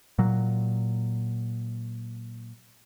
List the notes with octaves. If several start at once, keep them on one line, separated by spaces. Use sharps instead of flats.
A#2 F#3